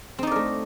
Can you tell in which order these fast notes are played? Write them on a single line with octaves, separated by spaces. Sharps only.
C4 D#4 D5 A#4 A3